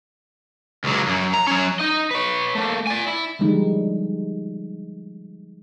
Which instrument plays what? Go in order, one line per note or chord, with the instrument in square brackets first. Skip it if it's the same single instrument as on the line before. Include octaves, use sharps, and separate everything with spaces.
[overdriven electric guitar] C#2 F#3
F#2
A#5
F#3 C#4
D#4 D#5
B4 C#5
A3 A#3
D5 G#5
E4
[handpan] D3 D#3 F3 G3 G#3 D#4